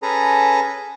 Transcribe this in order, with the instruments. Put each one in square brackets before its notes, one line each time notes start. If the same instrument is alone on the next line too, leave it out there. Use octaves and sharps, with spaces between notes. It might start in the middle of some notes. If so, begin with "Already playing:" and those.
[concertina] C#4 G#4 A4 B4 A#5